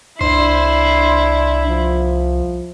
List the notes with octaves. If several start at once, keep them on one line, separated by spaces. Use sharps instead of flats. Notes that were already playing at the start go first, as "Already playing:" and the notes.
C2 D4 E4 C5
F3